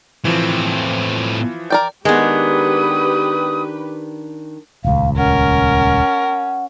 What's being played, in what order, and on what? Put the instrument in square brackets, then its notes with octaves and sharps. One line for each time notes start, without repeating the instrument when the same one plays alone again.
[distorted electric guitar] A2 C4 [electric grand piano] E3 F3
[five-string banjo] A#4 D5 G5
[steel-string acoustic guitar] D#3 D4 [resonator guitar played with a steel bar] G#3 B3 [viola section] G4 B4 [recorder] D#6
[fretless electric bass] D#1 C#2 [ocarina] F5
[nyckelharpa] C#4 [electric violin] A#4 [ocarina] F#5